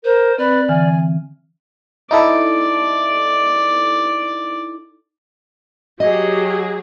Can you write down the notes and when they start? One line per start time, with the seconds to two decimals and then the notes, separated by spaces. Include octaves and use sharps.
0.04 A#4 C5
0.38 C4 B4 D5
0.69 D3 E3 G#5 F6
2.11 D#4 E4 A4 D5
6.00 F#3 G4 G#4 D#5